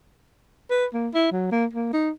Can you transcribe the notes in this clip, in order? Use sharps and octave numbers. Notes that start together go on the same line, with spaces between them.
B4
A#3
E4
F#3
A#3
A#3
D#4